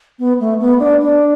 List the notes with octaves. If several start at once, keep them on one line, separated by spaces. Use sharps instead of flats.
B3
A3
B3
D4
D4